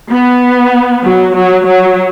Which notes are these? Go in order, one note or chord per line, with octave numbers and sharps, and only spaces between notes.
B3
F#3
F#3
F#3